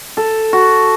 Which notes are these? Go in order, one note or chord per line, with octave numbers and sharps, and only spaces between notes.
A4
F#4